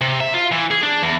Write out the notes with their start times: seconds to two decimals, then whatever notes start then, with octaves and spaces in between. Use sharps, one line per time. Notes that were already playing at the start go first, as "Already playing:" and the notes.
0.01 C3
0.21 E5
0.34 F4
0.52 E3
0.71 G#4
0.83 D4
1.03 E2